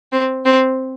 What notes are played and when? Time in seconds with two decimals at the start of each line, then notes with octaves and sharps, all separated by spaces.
0.12 C4
0.45 C4